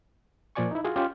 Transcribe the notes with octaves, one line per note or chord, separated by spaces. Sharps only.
A#2 F3 F4 D5 G#5 C#6
D#4 E4
F4 F#4 G#4
C#4 F4 G4